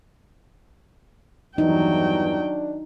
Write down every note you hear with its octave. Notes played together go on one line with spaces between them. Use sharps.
E2 G2 E3 F#3 D4 D#4 G5